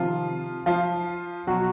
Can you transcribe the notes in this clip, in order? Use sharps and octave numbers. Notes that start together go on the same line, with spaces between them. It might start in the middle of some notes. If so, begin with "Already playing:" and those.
Already playing: C3 D#3 F3 F4
F3 F4
B2 F#3 F#4